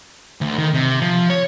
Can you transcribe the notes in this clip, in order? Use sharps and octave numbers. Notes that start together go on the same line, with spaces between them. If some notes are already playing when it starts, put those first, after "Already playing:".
D2
D#3
C3
F3
C#5